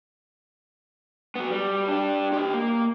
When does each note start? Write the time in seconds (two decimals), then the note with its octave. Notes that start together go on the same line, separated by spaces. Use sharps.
1.36 F#3 B3
1.51 G3
1.88 D4 G4
2.33 G4 D#5
2.54 A#3